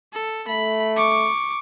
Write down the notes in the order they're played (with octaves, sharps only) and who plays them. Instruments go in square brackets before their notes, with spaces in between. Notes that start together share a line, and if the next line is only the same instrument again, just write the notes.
[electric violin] A4
[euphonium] A3 [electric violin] B5
[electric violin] C#6 D6